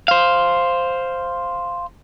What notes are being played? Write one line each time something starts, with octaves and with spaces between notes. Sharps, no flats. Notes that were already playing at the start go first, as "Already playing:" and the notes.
C5 F5